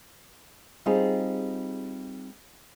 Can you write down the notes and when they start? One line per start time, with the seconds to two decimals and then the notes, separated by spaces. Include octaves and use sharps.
0.86 G3 C4 D#4 F4 G4 G#4